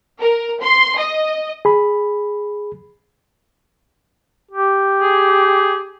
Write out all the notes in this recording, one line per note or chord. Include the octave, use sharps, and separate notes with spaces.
A#4
C6
D#5
G#4 B5
G4
G#4